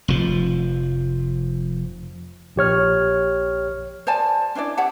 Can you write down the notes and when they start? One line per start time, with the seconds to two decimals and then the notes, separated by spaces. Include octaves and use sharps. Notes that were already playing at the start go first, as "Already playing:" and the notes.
0.08 F1 F3
2.56 A#1 G4 C#5 F6
4.07 C5 D5 G#5 A5
4.55 C#4 D4 E4 D5
4.77 G4 C#5 F#5 A5